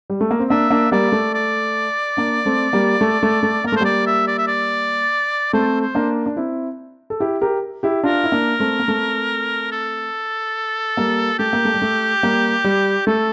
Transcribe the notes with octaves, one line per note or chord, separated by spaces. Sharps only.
G3
A3
A#3
C4
A#3 D4 E5
A#3 D4
G3 A#3 D5
A3
D5
A#3 D4
A3 C4
G3 A#3
A3
A3
A3
A#3 A#4
A3
C5
G3 A#3 D5
E5
D5
E5
D5
A3 C4 C5
C5
A#3 D4
D4
C4 E4
A4
E4 G4
G4 A#4
E4 G4
D4 F4 A#4
E4
A#3 D4
A3 C4
A#3
A3 C4
A4
G3 A#3
A3 G4
A#3
A3
G3
A3
G3 A#3
G3
A3 A4